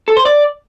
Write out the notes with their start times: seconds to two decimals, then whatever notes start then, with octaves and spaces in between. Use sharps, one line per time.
0.08 A4
0.17 C5
0.25 D5